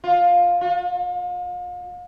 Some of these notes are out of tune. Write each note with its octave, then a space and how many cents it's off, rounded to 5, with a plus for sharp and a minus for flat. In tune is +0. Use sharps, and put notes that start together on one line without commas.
F4 +10
F4 +40